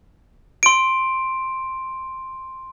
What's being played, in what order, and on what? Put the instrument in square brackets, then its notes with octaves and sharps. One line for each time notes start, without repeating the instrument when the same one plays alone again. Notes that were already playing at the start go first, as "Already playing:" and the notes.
[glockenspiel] C6 D7